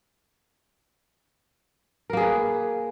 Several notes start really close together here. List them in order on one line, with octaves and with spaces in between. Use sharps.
A#4 A#3 G#4 B4